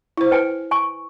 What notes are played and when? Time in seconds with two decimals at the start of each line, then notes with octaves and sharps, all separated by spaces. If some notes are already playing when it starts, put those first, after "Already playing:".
0.17 E4 C5
0.31 B4 G5 G#5
0.71 G#5 C#6